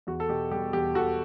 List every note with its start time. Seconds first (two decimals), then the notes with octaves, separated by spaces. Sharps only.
0.07 E2 F#4
0.20 A4
0.29 B2 G4
0.51 G3 G4
0.73 E2 G4
0.95 E2 F#4 A4